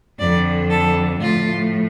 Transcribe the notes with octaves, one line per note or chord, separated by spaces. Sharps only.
F2 D3 F3 D5
A4
A2 F3 F4